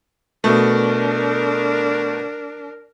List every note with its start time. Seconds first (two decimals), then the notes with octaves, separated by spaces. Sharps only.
0.44 B2 A3 D4 A#4